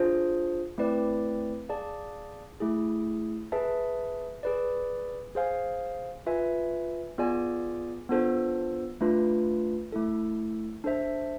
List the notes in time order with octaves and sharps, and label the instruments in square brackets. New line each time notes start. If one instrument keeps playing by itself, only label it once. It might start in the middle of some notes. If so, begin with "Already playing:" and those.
Already playing: [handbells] D4 F4 G#4 C5
A3 C4 E4 B4 D5
G#4 D5 F5 A5
A3 E4 G#4
G#4 B4 E5 A5
G#4 B4 D5
G#4 C5 F5 G#5
F4 B4 E5 G#5
B3 F4 G#4 D5 G#5
B3 D4 F4 A4 C5
A3 D4 F4 B4
A3 E4 A4
D4 A4 C5 E5 A5